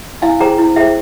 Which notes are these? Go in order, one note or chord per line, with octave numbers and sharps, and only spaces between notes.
E4 F5 G#5
G#4 C5 G5 A#5
E4
G#4 C5 E5 G5